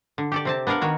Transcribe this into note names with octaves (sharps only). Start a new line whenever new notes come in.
D3
G4 A4 D5
C3 C4 A5
B3 D4 A#4 F5 F#5
D#3 F#4 C#5